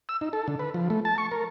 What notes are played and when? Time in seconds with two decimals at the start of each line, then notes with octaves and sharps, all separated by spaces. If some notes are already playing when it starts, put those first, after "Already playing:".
0.09 E6
0.21 D#4
0.33 A4
0.48 D3
0.59 B4
0.74 F3
0.90 A3
1.05 A5
1.18 C#6
1.31 A#4